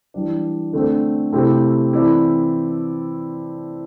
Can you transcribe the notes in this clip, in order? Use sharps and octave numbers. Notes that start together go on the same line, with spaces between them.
E3 G3 D4
D3 A3 C4
C3 A3 C4 E4 G4
E3 C4 E4 A4 D5